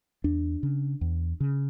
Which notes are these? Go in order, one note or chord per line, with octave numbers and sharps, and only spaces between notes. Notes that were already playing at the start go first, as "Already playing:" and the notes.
E2 D4
C#3
E2
C#3